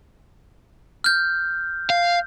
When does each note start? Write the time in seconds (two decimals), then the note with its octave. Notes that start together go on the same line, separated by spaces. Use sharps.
1.04 F6 G6
1.90 F5